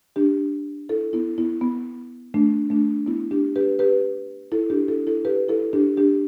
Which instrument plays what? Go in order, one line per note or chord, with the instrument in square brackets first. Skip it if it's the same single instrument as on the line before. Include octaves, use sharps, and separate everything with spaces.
[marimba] D4 G4
E4 A4
B3 E4
B3 E4
B3
A3 D4
A3 D4
B3 E4
D4 G4
G4 B4
G4 B4
E4 A4
D4 G4
E4 A4
E4 A4
G4 B4
E4 A4
D4 G4
D4 G4